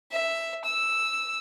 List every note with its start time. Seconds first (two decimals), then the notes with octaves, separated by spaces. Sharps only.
0.11 E5
0.65 E6